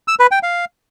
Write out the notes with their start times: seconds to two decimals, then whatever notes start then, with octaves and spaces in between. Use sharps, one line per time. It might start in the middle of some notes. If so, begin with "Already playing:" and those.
0.08 E6
0.20 B4
0.31 G5
0.43 F5